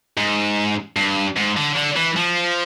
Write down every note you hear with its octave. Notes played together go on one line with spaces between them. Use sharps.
G#2
G2
G#2
D3
D3
E3
F3